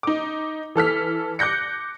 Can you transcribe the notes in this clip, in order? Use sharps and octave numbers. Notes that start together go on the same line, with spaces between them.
D#4 D6
E3 A4 F6 B6
D6 F#6 G6 A#6 C#7